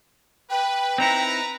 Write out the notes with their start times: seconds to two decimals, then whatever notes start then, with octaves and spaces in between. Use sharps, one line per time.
0.50 B4 G5
0.98 C4 D#4 E4 B4 A#5